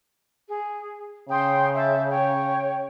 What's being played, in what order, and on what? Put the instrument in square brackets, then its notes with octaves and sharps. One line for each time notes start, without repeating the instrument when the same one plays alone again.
[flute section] G#4
[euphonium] C#3 [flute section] G5 C6 D#6
[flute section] E5 A5 G6
C#5 G5